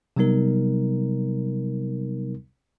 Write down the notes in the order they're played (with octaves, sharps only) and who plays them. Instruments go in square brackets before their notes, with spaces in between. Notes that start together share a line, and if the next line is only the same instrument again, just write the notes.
[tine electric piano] C3 F#3 G3 B3 D#4 A#4